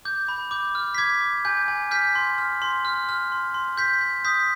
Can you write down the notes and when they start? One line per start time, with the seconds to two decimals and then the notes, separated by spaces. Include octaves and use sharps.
0.05 D6 G6
0.28 B5
0.51 D6 G6
0.75 F6
0.95 B6
0.98 D6 G#6
1.21 D6
1.45 G#5 G6
1.68 G#5
1.91 F6 G6 B6
2.15 C6
2.38 F6
2.62 C6
2.85 F6
3.09 F6
3.32 C6
3.54 C6
3.77 G6 B6
4.01 G6
4.25 D#6 G6 B6